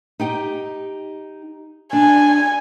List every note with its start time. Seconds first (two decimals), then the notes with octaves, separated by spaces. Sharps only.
0.20 D#4 G4 G5
1.93 D4 G#5